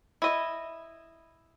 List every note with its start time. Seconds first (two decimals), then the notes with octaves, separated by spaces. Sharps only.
0.22 E4 D#5